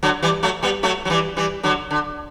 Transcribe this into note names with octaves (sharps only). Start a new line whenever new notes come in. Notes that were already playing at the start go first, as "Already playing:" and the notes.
D3 F#3
E3 G3
F#3 A3
G3 B3
F#3 A3
F#3
E3 G3
E3 G3
D3 F#3
D3